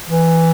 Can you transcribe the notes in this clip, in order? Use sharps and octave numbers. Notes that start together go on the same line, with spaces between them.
E3